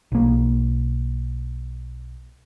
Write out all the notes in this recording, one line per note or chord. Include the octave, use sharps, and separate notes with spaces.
B1 A#3